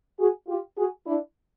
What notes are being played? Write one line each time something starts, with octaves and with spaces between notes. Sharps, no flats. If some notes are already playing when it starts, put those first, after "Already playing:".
F#4 G#4
F4 G4
F#4 G#4
D4 E4